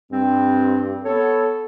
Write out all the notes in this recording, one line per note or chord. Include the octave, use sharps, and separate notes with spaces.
G2 C4
B3 A4 C#5